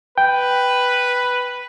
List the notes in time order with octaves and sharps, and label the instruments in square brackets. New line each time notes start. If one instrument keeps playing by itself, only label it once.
[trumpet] B4 [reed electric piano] G5